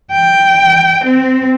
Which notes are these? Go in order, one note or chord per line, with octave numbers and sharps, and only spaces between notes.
G5
C4